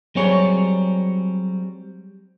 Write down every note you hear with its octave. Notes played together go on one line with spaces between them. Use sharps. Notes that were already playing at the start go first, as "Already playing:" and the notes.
F#3 G3 C4 G#4 C#5